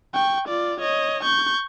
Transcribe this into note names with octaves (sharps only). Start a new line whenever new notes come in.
G5 C#6
F4 D5
C#5 D#5
C#6 G6